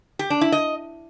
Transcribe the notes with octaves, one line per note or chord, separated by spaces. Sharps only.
G4
D4
E4
D#5